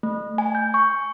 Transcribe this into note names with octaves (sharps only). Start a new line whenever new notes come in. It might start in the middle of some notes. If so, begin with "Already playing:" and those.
A3
G#5
G6
C#6